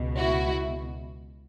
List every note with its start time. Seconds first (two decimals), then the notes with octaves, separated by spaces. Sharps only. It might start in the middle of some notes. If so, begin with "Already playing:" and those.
Already playing: C#2 B2
0.17 E4 F#4